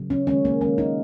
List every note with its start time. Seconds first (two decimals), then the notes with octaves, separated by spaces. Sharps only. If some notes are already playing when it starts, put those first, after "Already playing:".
Already playing: C#3 F#3
0.10 C#4
0.27 D#3 G#3 C#4
0.45 A#3
0.61 D#3 G#3 C#4
0.78 D#4